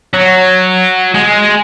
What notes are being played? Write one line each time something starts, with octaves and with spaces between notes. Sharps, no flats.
F#3
G#3